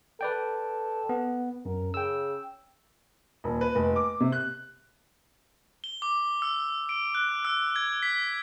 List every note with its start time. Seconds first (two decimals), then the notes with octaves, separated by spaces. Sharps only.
0.21 A4 B4 D5 G5
1.09 B3
1.65 F#2 A#4
1.94 C#3 G5 E6
3.44 D#1
3.61 B4
3.75 F1
3.96 D6
4.20 C3
4.32 F#6
5.84 G7
6.02 D6
6.42 E6
6.89 D7
7.15 F#6
7.45 E6
7.76 G#6
8.03 B6